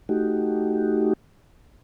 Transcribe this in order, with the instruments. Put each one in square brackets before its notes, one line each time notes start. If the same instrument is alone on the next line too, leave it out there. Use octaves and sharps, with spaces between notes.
[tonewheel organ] A3 D#4 F#4 G4